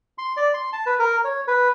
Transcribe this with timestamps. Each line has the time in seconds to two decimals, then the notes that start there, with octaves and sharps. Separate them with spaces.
0.18 C6
0.37 D5
0.54 C6
0.73 A5
0.86 B4
0.99 A#4
1.24 C#5
1.48 B4